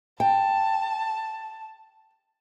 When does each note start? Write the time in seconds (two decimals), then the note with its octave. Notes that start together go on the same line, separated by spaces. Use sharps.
0.20 G5 A5